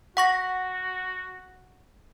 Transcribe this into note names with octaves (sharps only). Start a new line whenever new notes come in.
F#4 F#5 C#6 A#6